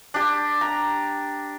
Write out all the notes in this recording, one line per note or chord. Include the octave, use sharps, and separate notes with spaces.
D4 G4
A#5